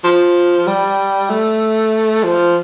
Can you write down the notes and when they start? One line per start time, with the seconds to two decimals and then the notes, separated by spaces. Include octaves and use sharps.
0.04 F3
0.67 G3
1.30 A3
2.24 F3